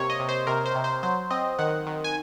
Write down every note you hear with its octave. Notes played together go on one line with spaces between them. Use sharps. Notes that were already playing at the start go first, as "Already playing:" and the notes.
Already playing: C3 A#3 C#5
D#5
C3
C5
C3 A#4
C5
C3
C5
F#3 C5
C4 D#5
D#3 F#5
D#3
G#5